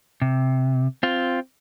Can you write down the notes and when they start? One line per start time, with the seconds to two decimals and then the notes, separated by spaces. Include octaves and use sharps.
0.22 C3
1.03 C4 F4